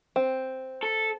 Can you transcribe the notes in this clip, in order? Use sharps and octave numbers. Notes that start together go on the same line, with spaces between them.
C4
A4